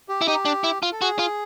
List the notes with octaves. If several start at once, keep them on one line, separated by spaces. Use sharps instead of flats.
G4
E4
D#4 G4
D4
E4
F4
A4
F#4 G#4
F4